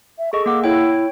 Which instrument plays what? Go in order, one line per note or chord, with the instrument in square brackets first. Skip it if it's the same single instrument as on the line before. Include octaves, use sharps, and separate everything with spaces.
[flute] E5
[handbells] G#4 A4 D#5 [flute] C#6
[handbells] A#3 F#5 [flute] D6
[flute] E4 [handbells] C#5 G5